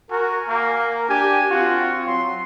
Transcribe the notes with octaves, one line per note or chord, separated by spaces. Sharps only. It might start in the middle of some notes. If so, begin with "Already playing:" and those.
F#4 A#4 G#5
A#3 A#4
D4 G4 G#5
C4 F4 F#4
F#3 C6